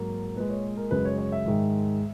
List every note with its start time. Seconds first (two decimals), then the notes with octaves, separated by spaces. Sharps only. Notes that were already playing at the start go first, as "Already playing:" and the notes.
Already playing: G#2 F#3 A#3
0.36 A#2 G#3 B4
0.50 C#5
0.77 A#4
0.91 F#2 C#3 G#3 B4
1.05 C#5
1.18 C#5
1.32 E5
1.46 G#2 D#3 G#3